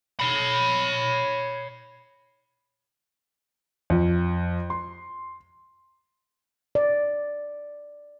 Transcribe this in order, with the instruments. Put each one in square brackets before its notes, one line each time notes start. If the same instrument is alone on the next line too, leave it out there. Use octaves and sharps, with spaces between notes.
[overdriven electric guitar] C#5 B5
[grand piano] F2
C6
[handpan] D5